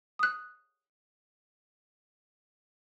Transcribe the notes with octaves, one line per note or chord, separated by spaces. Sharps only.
D#6 F#6